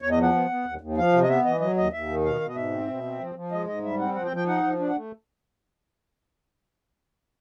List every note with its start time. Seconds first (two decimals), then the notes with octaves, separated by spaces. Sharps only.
0.02 E2 C#5
0.11 D#5
0.17 F3
0.22 F#5
0.33 B3
0.50 B3
0.65 D#2
0.81 D#2
0.97 F3 F5
1.13 C3
1.23 D#5
1.29 B3 E5
1.45 E3 D#5
1.60 F#3 D#5
1.76 D#2 D#5
1.93 D#2 E5
2.09 D#3
2.24 B2 F5
2.41 B2
2.49 D#5
2.56 G#2 E5
2.71 C4
2.88 B2
3.03 C4
3.20 F3
3.35 F3
3.52 G#3 D#5
3.67 G#2 D#5
3.83 G3 E5
3.99 C4 F#5
4.15 F3 F#5
4.25 G5
4.31 F3
4.36 G5
4.47 D#4 F#5
4.63 F3
4.79 D4
4.89 F#5
4.94 A3